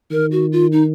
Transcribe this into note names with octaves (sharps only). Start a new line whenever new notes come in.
D#3 A#4
F#4
F4
D#4